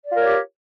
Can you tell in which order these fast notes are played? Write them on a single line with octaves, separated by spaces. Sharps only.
D5 F4 A#4 C#5 G4